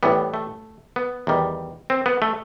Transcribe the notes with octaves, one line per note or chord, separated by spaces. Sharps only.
A2 E3 G3 B3
A3
B3
E2 D#3 G3
C4
B3
A3